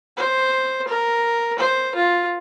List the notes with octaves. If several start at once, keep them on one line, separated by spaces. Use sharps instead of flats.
C5
A#4
C5
F4